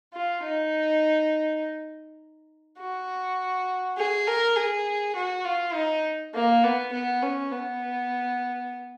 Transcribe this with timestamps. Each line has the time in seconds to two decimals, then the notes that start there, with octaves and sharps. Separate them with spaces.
0.14 F4
0.43 D#4
2.79 F#4
3.97 G#4
4.27 A#4
4.56 G#4
5.15 F#4
5.45 F4
5.74 D#4
6.34 A#3
6.64 B3
6.92 B3
7.22 C#4
7.52 B3